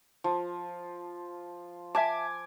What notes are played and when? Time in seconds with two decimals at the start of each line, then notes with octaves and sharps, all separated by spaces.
0.24 F3
1.95 E5 G#5 A5 D6